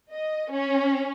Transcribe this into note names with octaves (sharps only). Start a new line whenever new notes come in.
D#5
C#4